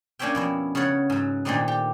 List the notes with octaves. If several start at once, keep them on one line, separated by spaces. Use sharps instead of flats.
A#3 C#4 D4 C#5 E5 G5
F2 B2 E4
C#3 A3 B3 C#5 F#5
G#2 F#3
A#2 D#3 A3 C4 D4 D#4
G4